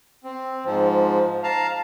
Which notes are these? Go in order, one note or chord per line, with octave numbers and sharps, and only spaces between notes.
C4
G#2 F3
F5 A5 A#5